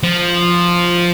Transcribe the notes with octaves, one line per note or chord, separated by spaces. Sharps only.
F3